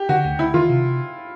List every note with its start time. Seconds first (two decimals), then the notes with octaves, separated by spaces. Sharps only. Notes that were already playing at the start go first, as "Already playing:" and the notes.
Already playing: G4
0.09 D3 F#4
0.24 D2
0.39 D2 E4
0.54 D#3 F4
0.69 C3